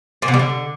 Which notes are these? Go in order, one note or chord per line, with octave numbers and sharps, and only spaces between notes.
A#2
B2
G3
D3